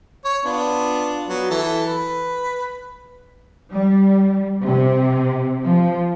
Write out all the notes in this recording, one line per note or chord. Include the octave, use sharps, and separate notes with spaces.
C#5 C#6
B3 D4 F4
F#3 B3
E3 A4
B4
G3
C3
F3